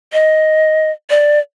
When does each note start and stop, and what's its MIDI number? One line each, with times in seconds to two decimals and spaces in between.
0.13 0.91 75
1.10 1.39 74